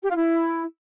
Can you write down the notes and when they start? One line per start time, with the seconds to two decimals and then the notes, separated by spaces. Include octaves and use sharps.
0.02 G4
0.09 F4
0.16 E4